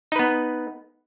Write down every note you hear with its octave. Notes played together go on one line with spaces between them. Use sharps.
B3 D#4 B4